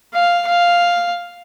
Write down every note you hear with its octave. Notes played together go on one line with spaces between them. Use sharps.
F5
F5